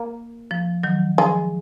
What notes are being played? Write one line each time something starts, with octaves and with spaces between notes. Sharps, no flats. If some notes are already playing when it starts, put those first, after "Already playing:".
Already playing: A#3
F3
D#3 F#3
F3 G#3